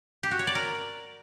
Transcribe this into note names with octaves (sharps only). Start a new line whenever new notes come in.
G4
F#4
C#5
D5
A#4